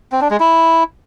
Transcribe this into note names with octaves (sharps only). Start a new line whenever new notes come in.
C4
D4
G#3
E4